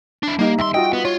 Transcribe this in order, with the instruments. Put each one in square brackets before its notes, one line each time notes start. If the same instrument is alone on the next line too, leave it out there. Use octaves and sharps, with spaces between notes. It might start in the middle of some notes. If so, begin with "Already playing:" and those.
[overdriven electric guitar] D4 E4
[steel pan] G3 D#4 [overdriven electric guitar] A#3
[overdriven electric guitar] D#2 C6 [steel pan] E5
[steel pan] F4 F#4 D#5 [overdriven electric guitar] G5
[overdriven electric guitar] B3
[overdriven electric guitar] F4 [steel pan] C#5